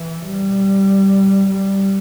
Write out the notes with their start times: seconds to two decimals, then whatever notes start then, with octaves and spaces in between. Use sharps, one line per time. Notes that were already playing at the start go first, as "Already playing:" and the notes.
Already playing: E3
0.26 G3
1.50 G3